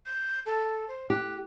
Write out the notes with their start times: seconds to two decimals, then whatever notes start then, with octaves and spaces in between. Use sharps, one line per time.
0.06 G6
0.46 A4
0.88 C5
1.10 G4 F#6